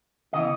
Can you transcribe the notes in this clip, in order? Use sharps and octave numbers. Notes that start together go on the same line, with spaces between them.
C#3 E3 B3 D#5